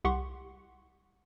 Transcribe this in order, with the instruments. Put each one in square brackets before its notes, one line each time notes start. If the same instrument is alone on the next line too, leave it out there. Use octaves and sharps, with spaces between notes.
[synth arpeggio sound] C2 G4 F#5 C6 C#6